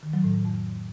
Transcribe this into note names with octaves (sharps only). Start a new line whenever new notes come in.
D#3
F#3
A2
A2
F2